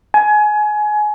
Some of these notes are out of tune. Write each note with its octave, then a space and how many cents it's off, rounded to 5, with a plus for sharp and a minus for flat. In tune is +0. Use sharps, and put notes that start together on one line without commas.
G#5 +25